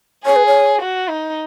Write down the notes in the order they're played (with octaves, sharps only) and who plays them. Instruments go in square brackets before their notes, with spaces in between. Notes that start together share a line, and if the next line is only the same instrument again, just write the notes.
[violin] G#4 [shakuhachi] C#5
[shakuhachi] B4
C#5
[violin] F#4
D#4